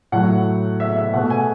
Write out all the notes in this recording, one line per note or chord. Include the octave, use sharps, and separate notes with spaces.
A2 F#3 A3 F#5
E5
E5
B2 A3 F#5
G#5